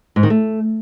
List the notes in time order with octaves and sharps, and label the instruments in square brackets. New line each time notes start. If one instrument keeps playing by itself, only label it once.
[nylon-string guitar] G#2
D#3
A3